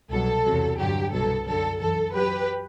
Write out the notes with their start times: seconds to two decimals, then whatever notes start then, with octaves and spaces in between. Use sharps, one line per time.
0.10 C2 B2 F#3 A4
0.44 E2 C3 F#3
0.78 G2 D3 F#3 G4
1.12 C2 B2 F#3 A4
1.46 F#2 D3 F#3 A4
1.80 F#2 E3 A4
2.14 F#2 F#3 G4 B4